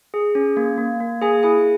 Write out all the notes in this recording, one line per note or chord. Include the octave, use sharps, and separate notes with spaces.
G#4
C#4
A#3
A#3
A#3
A#3 G#4 G#5
E4 G#4 G#5